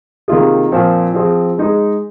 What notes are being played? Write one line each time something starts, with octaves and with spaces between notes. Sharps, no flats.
C3 D#3 A#3 F4 G#4
A#2 F3 C4
F3 C4 G#4
G#3 D#4 G#4